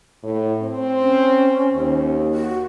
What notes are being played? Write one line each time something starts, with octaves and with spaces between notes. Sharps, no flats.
A2
C4
C#4
D#2
F#4